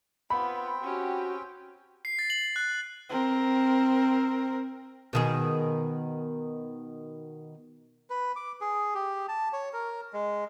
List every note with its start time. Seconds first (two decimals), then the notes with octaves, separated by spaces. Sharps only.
0.30 B3 C4 F4 G5 B5
0.83 C#4 F#4 G4
2.05 C7
2.19 A6
2.30 F#7
2.56 F#6
3.09 C4 A#4
5.13 B2 D#3 G#4
8.10 B4
8.36 D6
8.61 G#4
8.94 G4
9.29 A5
9.53 C#5
9.73 A#4
10.13 G#3